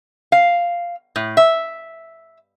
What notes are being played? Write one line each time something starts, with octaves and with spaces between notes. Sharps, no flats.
F5
A2
E5